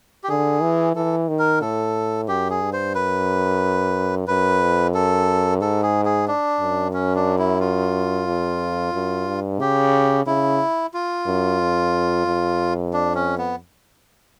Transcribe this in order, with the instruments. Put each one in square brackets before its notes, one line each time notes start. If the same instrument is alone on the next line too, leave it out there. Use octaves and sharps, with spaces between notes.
[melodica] G4
[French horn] D3 [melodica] G#4
[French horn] E3
[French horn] E3 [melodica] A4
[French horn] D#3
[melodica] A#4
[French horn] A2 [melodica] A4
[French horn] F#2 [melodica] G4
[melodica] G#4
[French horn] G2
[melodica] C5
[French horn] F#2 [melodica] B4
[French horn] F#2 [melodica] B4
[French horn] F2
[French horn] F#2 [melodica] A4
[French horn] G#2 [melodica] A4
[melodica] G#4
G#4
D4
[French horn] F#2
[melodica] C#4
D4
E4
F4
[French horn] F2
F#2
G2
[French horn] C#3 [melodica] G4
[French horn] C#3 [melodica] E4
[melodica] F4
[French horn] F#2
F2
F2
[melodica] D4
C#4
B3